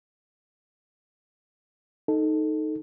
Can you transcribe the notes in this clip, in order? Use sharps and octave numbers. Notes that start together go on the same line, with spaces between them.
D#4 A4